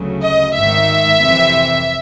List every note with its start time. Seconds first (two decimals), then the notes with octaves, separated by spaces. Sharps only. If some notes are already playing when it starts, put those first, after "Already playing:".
Already playing: D2 C#3 F#3 A3
0.22 D#5
0.55 G#1 G#2 D#3 E5
1.21 F2 C3 E3